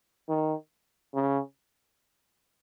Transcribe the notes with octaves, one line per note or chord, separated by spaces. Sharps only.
D#3
C#3